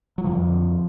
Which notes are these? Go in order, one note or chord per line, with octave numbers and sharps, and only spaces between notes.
F#3
F2 D3 F3